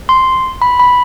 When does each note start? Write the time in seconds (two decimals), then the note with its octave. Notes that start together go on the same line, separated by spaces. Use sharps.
0.09 C6
0.62 B5
0.80 B5